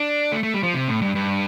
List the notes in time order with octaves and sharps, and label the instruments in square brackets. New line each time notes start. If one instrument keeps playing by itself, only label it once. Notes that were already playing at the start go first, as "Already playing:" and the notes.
Already playing: [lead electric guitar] D4
A3
A3
G3
F3
C3
A2
G2
G2